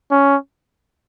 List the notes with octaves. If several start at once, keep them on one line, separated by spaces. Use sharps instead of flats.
C#4